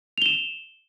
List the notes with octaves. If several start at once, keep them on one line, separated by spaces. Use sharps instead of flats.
E7 F7 G7